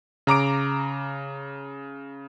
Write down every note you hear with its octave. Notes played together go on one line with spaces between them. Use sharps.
C#3 A#5 D6 D7